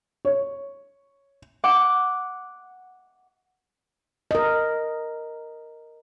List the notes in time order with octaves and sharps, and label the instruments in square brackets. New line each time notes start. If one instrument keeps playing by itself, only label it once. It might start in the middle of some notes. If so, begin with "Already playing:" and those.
[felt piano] C#5
[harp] F#5 D6
[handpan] A#4 D#5